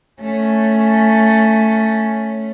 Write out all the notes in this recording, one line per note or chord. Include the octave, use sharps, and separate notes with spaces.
A3 C#4